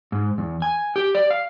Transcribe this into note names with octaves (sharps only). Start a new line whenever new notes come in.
G#2
E2
G#5
G4
D5
F5